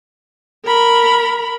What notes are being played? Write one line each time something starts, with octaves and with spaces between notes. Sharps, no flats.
A#4 B5